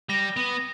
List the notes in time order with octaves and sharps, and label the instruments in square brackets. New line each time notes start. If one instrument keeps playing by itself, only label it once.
[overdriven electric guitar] G3 [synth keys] A#6
[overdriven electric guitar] B3